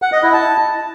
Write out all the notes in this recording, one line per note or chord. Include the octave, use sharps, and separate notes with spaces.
F#5
D#5
E4
A5